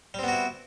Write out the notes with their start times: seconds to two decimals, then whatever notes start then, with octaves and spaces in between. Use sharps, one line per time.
0.14 G3
0.19 C4
0.23 B3
0.28 F#4
0.32 E4